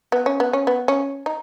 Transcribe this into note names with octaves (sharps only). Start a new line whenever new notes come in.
B3
C#4
B3
C#4
B3
C#4
D#4